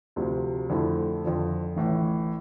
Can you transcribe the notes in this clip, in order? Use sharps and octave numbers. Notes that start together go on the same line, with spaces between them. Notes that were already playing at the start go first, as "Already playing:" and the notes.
D2 C3 F3
F2 D3 A3 E4
F2 D3 F3
A1 A2 E3